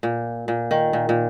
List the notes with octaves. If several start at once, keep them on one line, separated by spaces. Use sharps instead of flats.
A#2
A#2
D#3
A#2
A#2